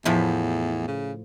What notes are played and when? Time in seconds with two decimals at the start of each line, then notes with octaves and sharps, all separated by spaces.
0.05 E2 A2 F3 E4
0.88 C#3